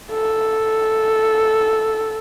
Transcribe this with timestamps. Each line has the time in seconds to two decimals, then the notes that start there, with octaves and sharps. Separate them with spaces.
0.11 A4